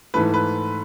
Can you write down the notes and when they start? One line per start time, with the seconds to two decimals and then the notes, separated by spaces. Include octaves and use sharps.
0.14 G#2 E3 A3 B4
0.34 B4